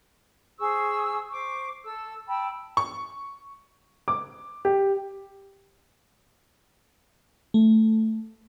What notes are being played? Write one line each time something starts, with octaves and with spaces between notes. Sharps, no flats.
G#4 C5 C#6 E6
C5 C#6 D6
A4 E6
G5 A5 B5 E6
C#6
D6
G4
A3